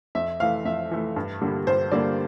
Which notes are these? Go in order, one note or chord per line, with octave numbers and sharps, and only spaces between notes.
F2 E5
E3 A3 F5
F2 E5
E3 A3
G2
D3 G3 A#3
G2 C5
D3 G3 A#3 D5